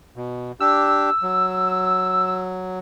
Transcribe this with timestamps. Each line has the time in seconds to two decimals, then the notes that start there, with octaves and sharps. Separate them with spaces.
0.16 B2
0.60 D4 G4 E6
1.23 F#3